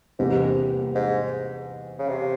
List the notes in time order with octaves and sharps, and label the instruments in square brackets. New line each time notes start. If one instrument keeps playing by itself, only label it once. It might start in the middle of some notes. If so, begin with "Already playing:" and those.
[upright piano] E2 C3 G3 A#3 [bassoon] G#2
[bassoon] G#2
C#3
C3